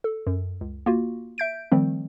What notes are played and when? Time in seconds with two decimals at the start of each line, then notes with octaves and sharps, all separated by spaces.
0.04 A4
0.27 F#2
0.61 C#2
0.86 A#3 F4 F#4
1.38 E5 G6 D7
1.72 D#3 F3 G3 A3 C4